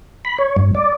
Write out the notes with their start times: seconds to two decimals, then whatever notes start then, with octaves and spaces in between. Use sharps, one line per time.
0.25 B5
0.38 C#5
0.56 G2
0.75 D5